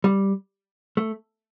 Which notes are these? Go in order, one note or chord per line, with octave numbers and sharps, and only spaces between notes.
G3
A3